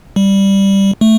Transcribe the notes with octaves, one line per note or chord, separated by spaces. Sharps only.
G3
A3